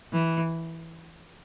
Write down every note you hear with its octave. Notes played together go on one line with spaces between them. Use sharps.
E3